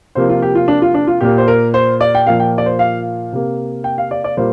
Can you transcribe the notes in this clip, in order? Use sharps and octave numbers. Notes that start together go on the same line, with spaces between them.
C3 F3 A#3 C5
F4
G4
F4
D4
F4
D4
F4
A#2 A#3 G4
C5
A#4
C5
D5
G5
A#2 F3 A#3 F5
G5
D5
C5
F5
C3 A#3
G5
F5
D5
D5
A#2 G3 A#3 C5